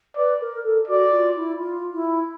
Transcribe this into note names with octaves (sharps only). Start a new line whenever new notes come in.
B4 D5
A#4
A4
F#4 D5
F4
E4
F4
E4